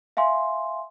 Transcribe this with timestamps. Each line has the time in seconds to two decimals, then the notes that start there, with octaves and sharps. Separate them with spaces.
0.17 E5 F5 G#5 C6